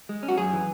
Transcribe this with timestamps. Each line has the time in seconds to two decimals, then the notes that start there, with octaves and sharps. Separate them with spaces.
0.09 G#3
0.23 C#4
0.29 F#4
0.38 F#2 G#4
0.53 E3